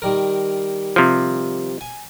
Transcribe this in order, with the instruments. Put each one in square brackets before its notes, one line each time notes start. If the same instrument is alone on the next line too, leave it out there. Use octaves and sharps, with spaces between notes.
[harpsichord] D#3 G3 A#4
[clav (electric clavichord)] C3 F3
[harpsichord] G#5